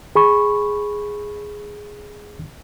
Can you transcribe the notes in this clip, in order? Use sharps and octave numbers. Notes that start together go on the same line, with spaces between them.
G#4 B5 C#6